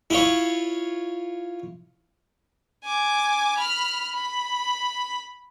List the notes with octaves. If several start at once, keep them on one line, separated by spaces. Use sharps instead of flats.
E4 F4 C#5
G#5 D6
B5 F6
B5